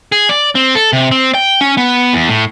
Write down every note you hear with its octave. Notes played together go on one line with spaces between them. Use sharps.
G#4
D5
C4
A4
C3
C4
G5
C#4
B3
E2
A2